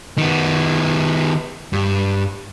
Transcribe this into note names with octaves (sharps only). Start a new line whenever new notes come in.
D#3 B3
G2